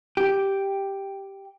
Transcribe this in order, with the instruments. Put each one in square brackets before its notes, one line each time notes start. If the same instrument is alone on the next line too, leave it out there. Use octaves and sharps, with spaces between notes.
[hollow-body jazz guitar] G4